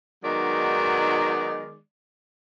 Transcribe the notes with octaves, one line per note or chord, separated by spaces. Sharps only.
D#3 F#3 G#3 B3 D#4 D5